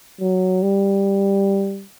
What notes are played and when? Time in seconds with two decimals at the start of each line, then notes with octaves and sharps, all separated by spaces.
0.21 F#3
0.62 G3